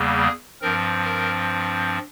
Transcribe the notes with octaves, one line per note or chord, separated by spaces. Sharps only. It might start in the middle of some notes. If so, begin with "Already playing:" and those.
Already playing: E2 C#3 G3 A#3
G#4
G2 F3 C4 A#4
A#4